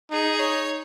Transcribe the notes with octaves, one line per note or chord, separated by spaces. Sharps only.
D#4 G#4
C#5